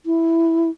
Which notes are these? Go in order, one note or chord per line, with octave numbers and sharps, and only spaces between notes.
E4